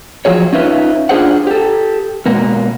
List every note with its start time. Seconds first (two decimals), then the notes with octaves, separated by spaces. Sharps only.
0.25 F3 F#3 G#4 C#5
0.53 C#4 D#4 F4 B4 E5
1.09 D4 F4 G#4 C5 F#5
1.47 G4 A4
2.26 B2 G#3 A#3 B3